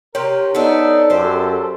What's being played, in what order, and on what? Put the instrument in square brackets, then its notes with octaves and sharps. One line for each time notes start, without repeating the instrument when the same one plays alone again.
[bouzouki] C3 G4 [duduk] A#4 [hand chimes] C#5
[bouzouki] B3 D4 [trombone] D#4 [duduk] A4
[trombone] F#2 [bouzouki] G4 C5